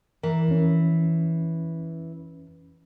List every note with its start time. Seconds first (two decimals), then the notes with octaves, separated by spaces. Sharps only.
0.23 E3 A#4
0.48 F2 C#4